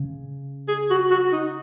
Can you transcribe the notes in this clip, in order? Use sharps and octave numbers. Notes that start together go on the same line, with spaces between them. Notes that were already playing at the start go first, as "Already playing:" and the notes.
Already playing: C#3
G#4
F#4
F#4
D#4